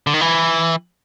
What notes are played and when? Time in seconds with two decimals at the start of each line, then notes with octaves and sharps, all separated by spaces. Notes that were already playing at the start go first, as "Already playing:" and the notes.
0.07 D3
0.14 D#3
0.21 E3